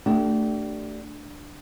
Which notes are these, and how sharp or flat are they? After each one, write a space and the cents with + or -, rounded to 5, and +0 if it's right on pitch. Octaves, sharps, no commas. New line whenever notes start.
A3 +15 D4 +0 G4 -35